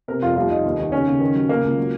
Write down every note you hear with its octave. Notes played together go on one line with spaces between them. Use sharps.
C3 A#4
F1 F4
C2 F4
C2 D#4
D#2
D#3
C#3 C#4
C#3
D#3
F#3
C#3 A#3
C#2
F#3